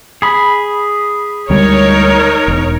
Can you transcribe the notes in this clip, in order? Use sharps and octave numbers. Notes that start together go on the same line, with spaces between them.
G#4 B5
D2 G3 G#3 D#4 A#4 C#5
E1